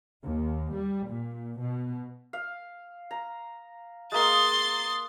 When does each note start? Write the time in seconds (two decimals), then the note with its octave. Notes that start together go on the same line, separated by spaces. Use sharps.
0.22 D#2
0.74 G3
1.07 A#2
1.59 B2
2.33 F5
3.11 A#5
4.12 G#3 A#3 C6 D#6 A6